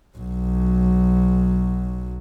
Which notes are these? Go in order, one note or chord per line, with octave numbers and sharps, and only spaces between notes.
B1 F#3